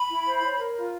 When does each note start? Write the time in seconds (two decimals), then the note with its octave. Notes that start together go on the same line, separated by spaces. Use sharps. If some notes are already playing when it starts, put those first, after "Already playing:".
Already playing: B5
0.09 E4
0.26 C5
0.43 C#5
0.59 A#4
0.77 F4